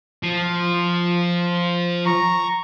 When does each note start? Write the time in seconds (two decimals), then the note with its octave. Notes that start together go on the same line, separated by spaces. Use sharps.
0.23 F3
2.06 A#5 C#6